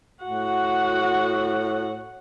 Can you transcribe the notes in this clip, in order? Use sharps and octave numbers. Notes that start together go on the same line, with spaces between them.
A2 F#4 F#5